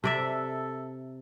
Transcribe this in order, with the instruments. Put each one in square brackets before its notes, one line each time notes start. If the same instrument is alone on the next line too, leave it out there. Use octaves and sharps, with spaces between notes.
[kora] C3 D5 E5 [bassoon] A4